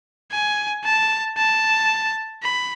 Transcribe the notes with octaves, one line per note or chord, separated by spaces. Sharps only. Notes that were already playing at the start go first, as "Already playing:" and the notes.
G#5
A5
A5
B5